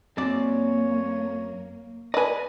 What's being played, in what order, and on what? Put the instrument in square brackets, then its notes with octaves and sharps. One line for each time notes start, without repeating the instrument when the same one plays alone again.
[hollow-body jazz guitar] F#2 C4 D5 [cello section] A#3 [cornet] C#5
[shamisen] B4 D5 [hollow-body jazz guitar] D#5 G#5